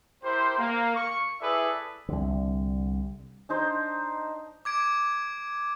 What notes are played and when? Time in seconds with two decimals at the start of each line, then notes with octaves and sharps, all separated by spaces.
0.24 E4 G4 A#4 C5
0.58 A#3
0.95 C#6
1.41 E4 G#4 A4 B4 D5 E5
2.09 C2 D3
3.49 D4 D#4 C5
4.65 D6 G#6 D7